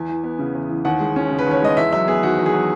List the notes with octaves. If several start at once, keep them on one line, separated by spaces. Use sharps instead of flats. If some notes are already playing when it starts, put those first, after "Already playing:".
Already playing: E2 G#5
E3
B3
C#3
E2
E3
D#2 F#5
G#3
C#4
C#3
B4
D#2 C#5
G#3 D#5
E2 E5
F#3 E5
B3 G#4
D#3 F#4
E2
G#4
F#3